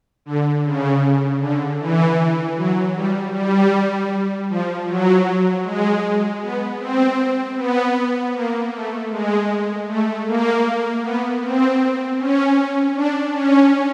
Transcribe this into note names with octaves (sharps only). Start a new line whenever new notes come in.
D3
C#3
D3
E3
F#3
G3
G3
F3
F#3
G#3
B3
C4
B3
A#3
A3
G#3
A3
A#3
B3
C4
C#4
D4
C#4